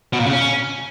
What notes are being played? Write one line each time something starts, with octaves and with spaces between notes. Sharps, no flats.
B2
A#2
C#3
C#4